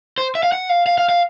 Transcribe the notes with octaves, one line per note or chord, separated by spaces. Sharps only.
C5
E5
F5
F#5
F5
F5
F5
F5